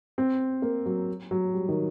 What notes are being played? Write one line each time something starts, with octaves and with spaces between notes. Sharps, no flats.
C4
A#3
F#3
F#3
G3
D#3